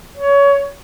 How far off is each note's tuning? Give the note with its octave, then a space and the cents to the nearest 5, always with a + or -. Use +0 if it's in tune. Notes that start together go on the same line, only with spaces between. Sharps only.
C#5 +20